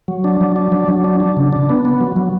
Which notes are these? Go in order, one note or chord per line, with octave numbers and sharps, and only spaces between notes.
F#3
D4
F#3
D4
F#3
F#3
D4
D4
C#3
D4
B3
B3
F#3
F#3